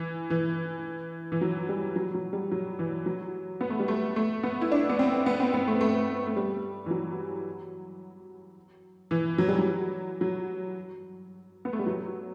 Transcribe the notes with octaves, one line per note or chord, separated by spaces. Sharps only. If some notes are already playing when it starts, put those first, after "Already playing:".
Already playing: E3
E3
E3
F#3
G3
F#3
F#3
G3
F#3
E3
F#3
B3
A3
G3
A3
A3
B3
E4
D4
B3
C4
B3
C4
B3
A3
A3
A3
G3
E3
F#3
E3
F#3
G3
F#3
F#3
B3
A3
G3
F#3